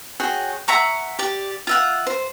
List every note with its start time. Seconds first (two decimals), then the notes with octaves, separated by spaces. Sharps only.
0.20 F#4 G#4 C#5 G5
0.68 E5 F#5 A#5 C#6
1.19 G4 D5
1.67 F4 E5 F#5
2.07 C5